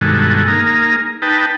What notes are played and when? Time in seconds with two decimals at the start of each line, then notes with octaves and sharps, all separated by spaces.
0.01 G2 B2 D#3 G#3 F#4 A4
0.48 A#3 D#4 G#4 A#4
1.22 D#4 B4 G5 A5